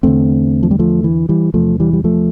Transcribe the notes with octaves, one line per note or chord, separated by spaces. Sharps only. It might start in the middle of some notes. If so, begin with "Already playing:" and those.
E2 D3 A3 C4
F3
G3
F3 A3
E3
E3 G3
E2 C3 F3 A3
E3 G3
G3
F3 A3